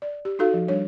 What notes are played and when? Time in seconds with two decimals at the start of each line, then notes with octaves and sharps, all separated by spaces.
0.02 D5
0.25 G4
0.39 D#4 F#4 A4 F5
0.54 F3
0.68 G3 D4 C#5